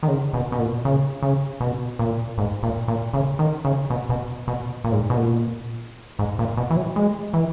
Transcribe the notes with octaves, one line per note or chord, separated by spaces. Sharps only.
D#3
C#3
B2
B2
A#2
C#3
C#3
B2
A#2
G#2
A#2
A#2
C#3
D#3
C#3
B2
B2
B2
A#2
G#2
B2
A#2
G#2
A#2
B2
E3
F#3
G#3
E3